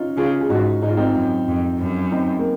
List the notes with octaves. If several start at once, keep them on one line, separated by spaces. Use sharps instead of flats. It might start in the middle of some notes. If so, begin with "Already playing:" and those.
Already playing: C#4 D#4 F4
C#3 F4 G#4
G#4
G#2 D#4 F#4
G#2 D#4
F4
C4 D#4
F#2
F2
F#2
C4 D#4
A#3